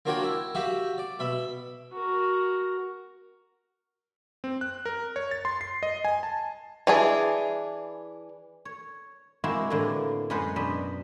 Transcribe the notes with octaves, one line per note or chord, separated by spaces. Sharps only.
A#3 D4 F4 F#4 C#5 G5
E4
F#4 G4 E5 F5
D5
B2 E5 B5
F#4 A#4
C4
F#6
A#4
C#5
A6
C6
C7
D#5
G#5
A5
E3 D4 G#4
C#5
G#3 A#3 C4 E4 F#4 G4
A2 D3 E3 A#3
F#2 G#3 B4 C5 F#5 B5
F#2 B2 D4 D#5 B5